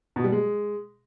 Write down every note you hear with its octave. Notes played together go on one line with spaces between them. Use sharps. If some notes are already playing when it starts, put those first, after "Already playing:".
B2
G3
G#3